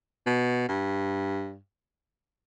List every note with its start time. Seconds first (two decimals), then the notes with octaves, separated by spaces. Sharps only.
0.27 B2
0.69 G2